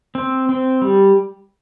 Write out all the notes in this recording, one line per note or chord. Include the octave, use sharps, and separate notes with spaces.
C4
C4
G3